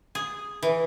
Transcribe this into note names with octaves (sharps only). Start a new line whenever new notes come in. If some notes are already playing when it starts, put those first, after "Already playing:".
G#4
E3